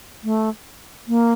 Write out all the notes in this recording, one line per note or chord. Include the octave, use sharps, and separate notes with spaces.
A3
A#3